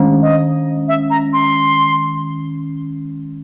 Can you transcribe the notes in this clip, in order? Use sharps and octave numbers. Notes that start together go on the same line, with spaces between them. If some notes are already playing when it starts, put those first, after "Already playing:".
Already playing: D#3 G#3 C#4
D#5
E5
A#5
C6